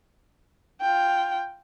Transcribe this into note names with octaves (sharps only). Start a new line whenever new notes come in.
F4 G5